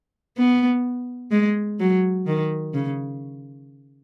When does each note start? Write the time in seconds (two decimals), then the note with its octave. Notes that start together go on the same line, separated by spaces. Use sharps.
0.38 B3
1.31 G#3
1.79 F#3
2.27 D#3
2.74 C#3